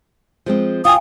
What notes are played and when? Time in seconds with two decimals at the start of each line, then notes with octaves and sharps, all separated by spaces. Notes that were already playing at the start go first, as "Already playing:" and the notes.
0.46 F3 G#3 C4
0.85 D#2 F4 F5 G5 G#5 D#6